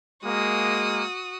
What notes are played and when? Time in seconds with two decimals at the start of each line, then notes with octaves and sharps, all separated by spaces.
0.25 G#3 A#3 F#4 D#6